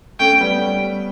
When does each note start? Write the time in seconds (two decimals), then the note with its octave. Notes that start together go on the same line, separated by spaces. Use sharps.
0.20 A3 C#4 G5
0.40 G3 B3